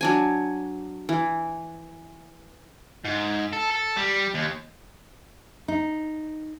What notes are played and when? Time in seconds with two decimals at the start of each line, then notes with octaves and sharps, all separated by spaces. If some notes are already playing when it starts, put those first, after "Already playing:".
0.01 F#3 D4 G#5
1.09 E3
3.05 G#2
3.53 A4
3.71 A4
3.97 G3
4.35 D#2
5.68 D#4